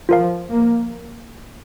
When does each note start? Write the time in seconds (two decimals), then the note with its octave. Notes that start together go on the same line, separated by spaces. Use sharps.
0.08 F3 F4 A#4 F5
0.50 A#3